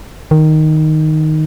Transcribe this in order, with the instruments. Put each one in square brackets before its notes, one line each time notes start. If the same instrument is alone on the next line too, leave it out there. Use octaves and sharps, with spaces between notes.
[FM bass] D#3